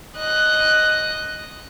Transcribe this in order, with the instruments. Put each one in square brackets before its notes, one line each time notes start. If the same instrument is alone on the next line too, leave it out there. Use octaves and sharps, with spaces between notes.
[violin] D#5 F#6